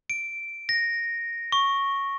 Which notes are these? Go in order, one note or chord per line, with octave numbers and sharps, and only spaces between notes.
D7
A#6
C#6